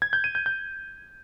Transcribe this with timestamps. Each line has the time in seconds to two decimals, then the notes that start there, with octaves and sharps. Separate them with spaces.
0.02 G#6
0.13 G6
0.24 D#7
0.35 G6
0.46 G6